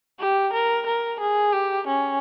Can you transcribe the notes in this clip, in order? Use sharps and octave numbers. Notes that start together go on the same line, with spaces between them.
G4
A#4
A#4
G#4
G4
C#4